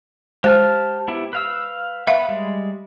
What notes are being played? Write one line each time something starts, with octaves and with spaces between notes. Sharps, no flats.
G#3 G4 C5 A5 F6
B3 E4 G4
B4 F5 E6
B3 B4 E5 F5
G3 G#3